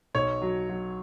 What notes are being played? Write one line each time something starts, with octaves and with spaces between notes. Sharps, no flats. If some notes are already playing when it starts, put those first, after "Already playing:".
B1 C#5
F#3
F#3